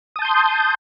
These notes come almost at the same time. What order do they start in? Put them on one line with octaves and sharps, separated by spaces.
D#6 A5 G6 C6